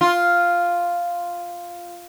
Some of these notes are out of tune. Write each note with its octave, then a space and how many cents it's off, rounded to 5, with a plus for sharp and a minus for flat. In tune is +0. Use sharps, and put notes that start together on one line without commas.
F4 +0